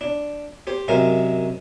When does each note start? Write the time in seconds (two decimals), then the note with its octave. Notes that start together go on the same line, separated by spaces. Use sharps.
0.01 D4
0.67 G4 C5
0.88 F#2 C3 G#3 A#4 F5